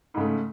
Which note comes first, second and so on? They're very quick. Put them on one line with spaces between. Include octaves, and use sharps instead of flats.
G#2 C#3 A3